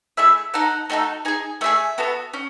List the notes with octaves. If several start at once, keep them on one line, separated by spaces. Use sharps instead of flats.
A3 E4 G#4 E5
D#4 A4 F#5
A3 D#4 F#4 A4
D#4 G#4 G#5
A3 E4 G#4 E5
B3 F#4 A4
C#4